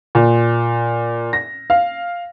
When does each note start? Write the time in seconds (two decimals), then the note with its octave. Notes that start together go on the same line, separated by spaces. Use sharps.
0.15 A#2
1.33 A#6
1.70 F5